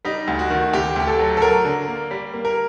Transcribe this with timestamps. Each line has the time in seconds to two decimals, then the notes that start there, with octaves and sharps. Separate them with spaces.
0.05 G3 D#4
0.27 D2
0.39 F#4
0.50 D#3
0.73 D2 G4
0.96 D2 G4
1.07 A4
1.19 F#3
1.37 A4
1.42 F#3 A#4
1.65 D3
1.88 A#3
2.11 G3
2.34 A#3
2.45 A#4